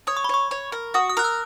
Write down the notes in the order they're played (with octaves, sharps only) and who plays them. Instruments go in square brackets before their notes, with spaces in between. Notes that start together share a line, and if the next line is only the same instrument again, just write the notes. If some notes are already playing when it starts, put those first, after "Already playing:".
[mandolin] C#5 [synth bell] D#6
[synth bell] C#6
B5
[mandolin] C#5 [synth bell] C#6
[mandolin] C#5
A#4
[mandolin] F#4 [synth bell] D#6
[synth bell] D#6
[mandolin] A#4 [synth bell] F#6
[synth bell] E6